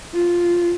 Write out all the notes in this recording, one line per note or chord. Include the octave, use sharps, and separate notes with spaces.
F4